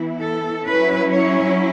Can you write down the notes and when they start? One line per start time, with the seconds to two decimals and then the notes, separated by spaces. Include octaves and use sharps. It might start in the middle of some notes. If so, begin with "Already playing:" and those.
Already playing: E3 B3 E4
0.21 A4
0.67 F#3 C#4 E4 B4
1.12 C#5